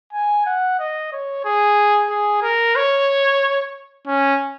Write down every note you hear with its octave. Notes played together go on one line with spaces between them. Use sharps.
G#5
F#5
D#5
C#5
G#4
G#4
A#4
C#5
C#4